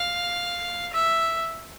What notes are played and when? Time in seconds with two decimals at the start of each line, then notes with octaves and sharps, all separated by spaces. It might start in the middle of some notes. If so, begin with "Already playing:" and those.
Already playing: F5
0.93 E5